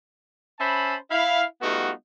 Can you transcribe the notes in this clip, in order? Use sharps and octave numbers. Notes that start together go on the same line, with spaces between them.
C#4 C5 E5 A5 B5
E4 F5
G3 A3 B3 D#4 F4 F#4